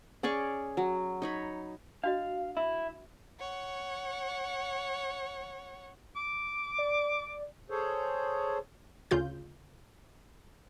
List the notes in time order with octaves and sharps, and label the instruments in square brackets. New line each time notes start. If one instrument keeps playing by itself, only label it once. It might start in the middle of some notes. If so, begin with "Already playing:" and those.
[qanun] C#4 G#4 D5 C#6
F#3
D#4 C#5 B5
[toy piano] D4 F#4 D#5 [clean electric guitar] F5
[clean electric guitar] E4 [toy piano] E5
[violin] C#5 F#5
[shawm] D6
[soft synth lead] D5
[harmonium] G#4 A4 C5 C#5
[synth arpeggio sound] D2 C#3 F4 G6